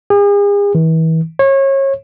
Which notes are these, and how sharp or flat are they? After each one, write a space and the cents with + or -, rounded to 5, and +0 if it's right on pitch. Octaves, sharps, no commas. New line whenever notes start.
G#4 -40
E3 -35
C#5 -30